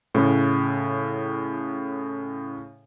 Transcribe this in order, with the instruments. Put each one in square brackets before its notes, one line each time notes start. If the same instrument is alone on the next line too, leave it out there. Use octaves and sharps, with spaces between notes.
[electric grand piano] A2 C#3